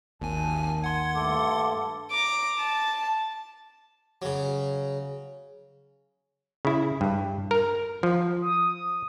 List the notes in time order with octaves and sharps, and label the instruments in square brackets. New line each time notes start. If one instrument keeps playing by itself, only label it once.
[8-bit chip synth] G#1 G#5 [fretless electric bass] D#2 [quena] A5
[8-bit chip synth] F#5 C6 [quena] G#6
[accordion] G2 A3 A4 [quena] D6
[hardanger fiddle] A#5 D6
A5
[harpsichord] C#3 F#3
[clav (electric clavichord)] C#3 E4
G2
A#4
F3
[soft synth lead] D#6